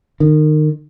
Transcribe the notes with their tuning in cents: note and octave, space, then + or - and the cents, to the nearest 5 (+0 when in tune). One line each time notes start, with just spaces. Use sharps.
D#3 -25